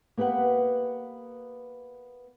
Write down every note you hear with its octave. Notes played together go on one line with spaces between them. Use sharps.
A#3 B3 G4 B4 F#5